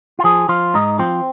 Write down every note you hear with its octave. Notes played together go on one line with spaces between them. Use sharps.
F4
F3 G#4
F3 F4
G#2 D#4
F3 C4